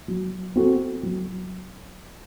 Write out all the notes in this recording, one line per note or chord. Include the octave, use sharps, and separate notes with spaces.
F#3
C4 F#4 A4
F#3